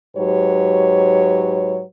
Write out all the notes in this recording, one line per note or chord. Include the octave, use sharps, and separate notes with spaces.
G#2 F#3 G4 B4 C#5